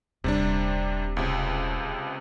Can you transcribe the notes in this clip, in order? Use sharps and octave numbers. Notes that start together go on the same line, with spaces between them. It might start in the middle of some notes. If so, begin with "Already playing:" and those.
D#1 C3 G3 D4
C#2 C3